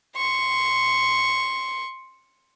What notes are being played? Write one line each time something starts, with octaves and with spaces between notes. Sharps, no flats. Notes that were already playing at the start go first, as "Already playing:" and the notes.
C6 C#6